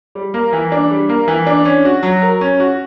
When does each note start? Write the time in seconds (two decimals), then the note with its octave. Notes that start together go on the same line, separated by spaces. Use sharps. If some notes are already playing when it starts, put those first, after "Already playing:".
0.15 G3
0.34 A#3
0.53 E3
0.72 D4
0.91 G3
1.09 A#3
1.28 E3
1.47 D4
1.65 C#4
1.85 F#4
2.03 F#3
2.22 A#4
2.41 C#4
2.60 F#4